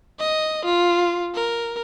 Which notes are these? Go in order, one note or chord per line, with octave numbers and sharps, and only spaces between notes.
D#5
F4
A#4